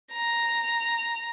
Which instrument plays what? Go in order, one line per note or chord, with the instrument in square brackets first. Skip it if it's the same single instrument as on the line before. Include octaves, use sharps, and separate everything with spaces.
[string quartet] A#5